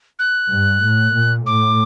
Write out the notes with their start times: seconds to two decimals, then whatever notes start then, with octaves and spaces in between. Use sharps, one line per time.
0.19 F#6
0.51 G2
0.83 A2
1.15 A#2
1.46 A2 D6